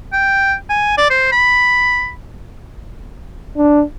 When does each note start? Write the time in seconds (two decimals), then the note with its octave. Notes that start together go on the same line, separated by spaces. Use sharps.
0.13 G5
0.70 G#5
0.98 D5
1.10 C5
1.32 B5
3.57 D4